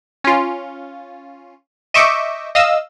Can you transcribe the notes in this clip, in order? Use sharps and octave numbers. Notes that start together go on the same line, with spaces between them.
C#4 F4
D#5 E5 C#6 D6 G6
D#5 F5 E6